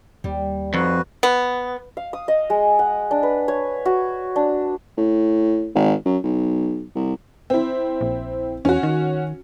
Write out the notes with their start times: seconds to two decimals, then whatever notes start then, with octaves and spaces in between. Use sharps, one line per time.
0.24 D#2 G3
0.74 F2 D#4 F#4 B4
1.23 B3
1.97 F5
2.13 D#6
2.28 D#5
2.50 G#3
2.79 F#5
3.11 D4
3.23 B4
3.48 C#5
3.85 F#4
4.36 D4
4.97 A2
5.75 G#1
6.06 F#2
6.24 B1
6.95 C2
7.50 C4 E4
8.01 A#1
8.65 E2 C#4 F#4
8.83 D#3